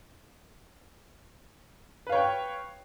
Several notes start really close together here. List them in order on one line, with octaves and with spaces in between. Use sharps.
B4 F5 C#5 G5